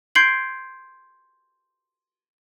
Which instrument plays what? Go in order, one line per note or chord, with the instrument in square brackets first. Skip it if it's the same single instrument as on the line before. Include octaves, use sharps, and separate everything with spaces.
[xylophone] C6 G6 G#6 C7 D7 F#7